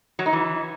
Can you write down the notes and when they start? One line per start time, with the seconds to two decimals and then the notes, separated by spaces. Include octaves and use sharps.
0.19 F#3
0.26 D#4
0.33 E3